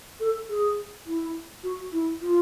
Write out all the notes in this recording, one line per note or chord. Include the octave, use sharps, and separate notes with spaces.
A4
G#4
E4
F#4
E4
F4